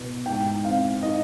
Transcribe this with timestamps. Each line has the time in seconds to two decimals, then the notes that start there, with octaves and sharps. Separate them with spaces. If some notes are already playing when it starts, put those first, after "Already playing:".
Already playing: B2 B3
0.26 G#2 G5
0.64 C4 F5
1.03 D#4 D#5